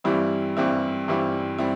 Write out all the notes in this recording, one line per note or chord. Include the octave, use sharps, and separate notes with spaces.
G2 E3 G3 C4 E4
G2 E3 G3 C4 E4
G2 E3 G3 C4 E4
G3 C4 E4